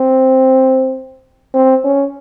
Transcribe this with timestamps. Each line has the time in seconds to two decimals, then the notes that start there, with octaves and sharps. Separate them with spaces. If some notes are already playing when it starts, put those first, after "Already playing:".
Already playing: C4
1.54 C4
1.84 C#4